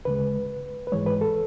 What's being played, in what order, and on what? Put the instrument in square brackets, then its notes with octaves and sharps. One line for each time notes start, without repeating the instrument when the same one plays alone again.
[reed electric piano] D2 C#3 G#3 B4
B4
G#2 E3 G#3 C#5
B4
A4